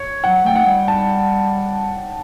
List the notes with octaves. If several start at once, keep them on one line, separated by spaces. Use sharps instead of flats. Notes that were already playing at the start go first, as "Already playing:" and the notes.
Already playing: C#5
F#3 F#5
A3 G5
F#5
G3
A5